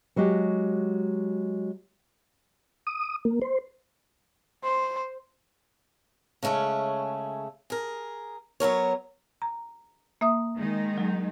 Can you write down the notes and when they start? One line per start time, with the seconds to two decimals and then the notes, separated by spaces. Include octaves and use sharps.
0.16 F#3 G#3 F#4 G4
2.87 D#6
3.25 A#3
3.42 C5
4.63 C5
6.43 C#3 G#3 A3 C#4 C#5
7.70 G#4 A#4
8.60 F#3 B3 A#4 C#5
9.42 A#5
10.21 A#3 E5 D#6
10.55 D#3 G#3 D#4
10.98 F#3